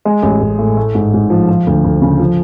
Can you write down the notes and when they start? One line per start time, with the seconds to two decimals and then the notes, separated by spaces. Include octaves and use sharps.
0.05 G#3
0.23 A1
0.41 A1
0.58 A2
0.77 A3
0.95 G#2
1.13 G#2
1.30 F3
1.48 F3
1.67 D2
1.84 D2
2.02 C#3
2.19 F3